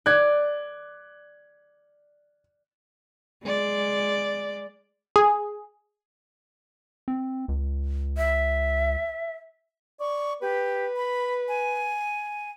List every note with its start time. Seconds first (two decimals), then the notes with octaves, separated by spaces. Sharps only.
0.06 D5 F#6 G#6
3.44 G#3 D5
5.16 G#4
7.08 C4
7.48 C#2
8.17 E5
10.00 D5 C#6
10.42 G4 B4
10.96 B5
11.48 G#5